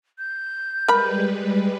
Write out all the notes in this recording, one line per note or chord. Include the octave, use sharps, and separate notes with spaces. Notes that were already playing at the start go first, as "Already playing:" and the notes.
G6
G3 G#3 A#4 B4 B5